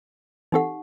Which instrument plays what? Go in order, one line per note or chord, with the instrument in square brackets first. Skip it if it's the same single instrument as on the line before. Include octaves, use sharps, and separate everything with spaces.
[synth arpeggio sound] E3 C4 A4 [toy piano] D#4 G4 F#5